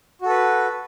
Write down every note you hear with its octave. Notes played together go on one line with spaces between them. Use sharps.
F#4 A4 B4